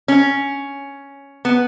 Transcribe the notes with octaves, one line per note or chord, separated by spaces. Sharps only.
C#4
B3